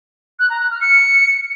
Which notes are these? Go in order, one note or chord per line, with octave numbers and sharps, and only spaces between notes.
F#6
A#5
F#6
F6
C#7